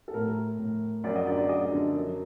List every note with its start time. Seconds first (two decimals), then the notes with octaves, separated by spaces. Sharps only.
0.08 A4
0.14 A2 A#4
0.59 A2
1.04 F#2 D5
1.16 D#5
1.26 D3 D5
1.37 D5
1.49 F#2 D#5
1.71 D3
1.94 F#2